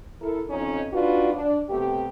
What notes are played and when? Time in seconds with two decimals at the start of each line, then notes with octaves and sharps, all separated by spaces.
0.22 E4 A4 A#4
0.50 F2 C#4 D#4
0.93 D4 D#4 F4 F#4 B4
1.34 D4
1.70 C3 A3 B3 G4